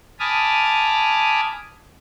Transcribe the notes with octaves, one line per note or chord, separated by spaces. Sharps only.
G#5 A5 B5 D6 D#6 F6